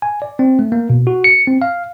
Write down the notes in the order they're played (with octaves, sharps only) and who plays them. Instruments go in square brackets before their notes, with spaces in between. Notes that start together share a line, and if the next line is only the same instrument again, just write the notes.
[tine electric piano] G#5
D5
C4
A3
A#3
B2
F#4
C#7
C4
F5